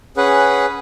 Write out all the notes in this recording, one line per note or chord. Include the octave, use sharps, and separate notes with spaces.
C#4 G#4 B4 F#5